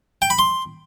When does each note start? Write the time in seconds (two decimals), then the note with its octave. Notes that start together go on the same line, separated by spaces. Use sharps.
0.22 G5
0.30 B5
0.39 C6